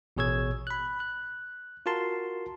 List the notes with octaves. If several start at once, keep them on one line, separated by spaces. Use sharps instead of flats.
A1 B2 G#4 C#5 E6 G#6
B5 F#6
F#6
F4 F#4 A#4 A5 C6